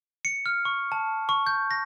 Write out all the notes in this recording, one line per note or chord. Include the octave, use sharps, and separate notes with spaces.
C#7
F6
C#6
A5
C#6
G6
A#6